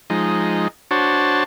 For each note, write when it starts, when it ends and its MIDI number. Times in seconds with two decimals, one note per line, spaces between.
0.10 0.68 53
0.10 0.68 56
0.10 0.68 63
0.91 1.44 62
0.91 1.44 66
0.91 1.44 72
0.91 1.44 73
0.91 1.44 81